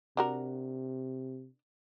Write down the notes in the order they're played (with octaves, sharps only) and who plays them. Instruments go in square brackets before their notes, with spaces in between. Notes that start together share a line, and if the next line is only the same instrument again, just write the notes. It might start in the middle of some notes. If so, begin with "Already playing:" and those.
[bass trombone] C3 [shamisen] D4 F#4 A#4